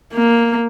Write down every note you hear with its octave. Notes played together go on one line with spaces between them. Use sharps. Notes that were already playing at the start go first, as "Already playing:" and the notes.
A#3